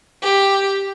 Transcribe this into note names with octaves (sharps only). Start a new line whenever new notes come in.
G4